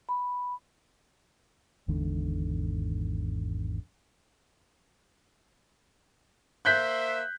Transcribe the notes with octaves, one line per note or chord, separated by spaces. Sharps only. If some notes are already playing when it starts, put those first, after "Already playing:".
B5
G#1 E2 G#2 D3
A#3 C5 E5 F#6 G6 B6